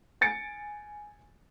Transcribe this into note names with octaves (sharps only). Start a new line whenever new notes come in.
G#5 A6 C#7 D7